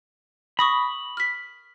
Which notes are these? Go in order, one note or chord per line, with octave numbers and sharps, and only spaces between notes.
B5 C#6 D#6 A#6
F6 B6